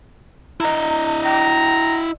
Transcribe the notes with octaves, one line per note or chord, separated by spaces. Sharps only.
E4 D#5 A#5
G5 A#5